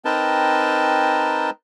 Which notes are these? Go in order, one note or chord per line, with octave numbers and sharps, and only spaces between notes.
C4 D#4 A#4 B4 G5 A5